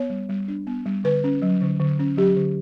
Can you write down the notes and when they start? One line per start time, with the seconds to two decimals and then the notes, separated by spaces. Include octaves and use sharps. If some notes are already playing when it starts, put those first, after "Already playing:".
Already playing: B3 C#5
0.10 G3
0.29 G3
0.48 D4
0.67 B3
0.86 G3
1.04 D3 B4
1.24 C#4
1.42 F#3
1.61 D3
1.80 D3
1.99 C#4
2.17 F#3 G4
2.36 D3